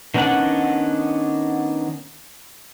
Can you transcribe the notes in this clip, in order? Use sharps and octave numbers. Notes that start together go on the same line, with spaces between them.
D#3 B3 C#4 D4 F#5